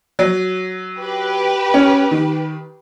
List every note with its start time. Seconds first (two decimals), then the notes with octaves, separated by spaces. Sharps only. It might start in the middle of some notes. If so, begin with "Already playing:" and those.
0.19 F#3
0.99 G4 B4
1.74 C#4
2.11 D#3